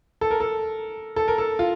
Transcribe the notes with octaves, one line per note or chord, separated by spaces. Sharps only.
A4
A#4
A4
A4
A#4
A4
F4